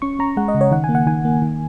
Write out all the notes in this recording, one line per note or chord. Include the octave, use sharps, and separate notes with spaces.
C#4 C#6
C#4 A#5
G#3 F#5
D#5
C#3
C#5
D#3 F#5
A#3 G#5
F#5
D#3 G#5
A#3
D#3